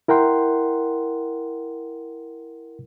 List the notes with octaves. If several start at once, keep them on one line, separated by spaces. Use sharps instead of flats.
E4 A#4 F#5 G5 C6